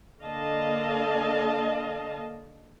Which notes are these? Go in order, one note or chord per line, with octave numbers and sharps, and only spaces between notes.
D3 A#3 D#5 F5 A5